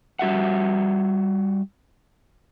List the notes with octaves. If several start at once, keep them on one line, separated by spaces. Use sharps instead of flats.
G3 F#4 E5 F#5